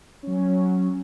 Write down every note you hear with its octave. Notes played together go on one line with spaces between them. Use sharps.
F#3 C#4